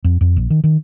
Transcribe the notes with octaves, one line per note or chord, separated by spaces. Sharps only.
F2
F2
A#1
D#3
D#3